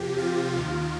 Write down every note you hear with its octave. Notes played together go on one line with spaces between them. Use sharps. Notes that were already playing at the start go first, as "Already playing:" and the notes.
Already playing: F2 C3 F3 G4
F4
D#2 D#3